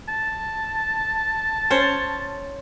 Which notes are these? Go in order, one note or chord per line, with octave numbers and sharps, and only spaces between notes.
A5
C#4 C5 C#5